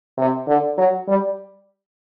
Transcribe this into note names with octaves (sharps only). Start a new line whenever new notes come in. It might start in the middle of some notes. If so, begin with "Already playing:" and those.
C3
D3
F#3
G3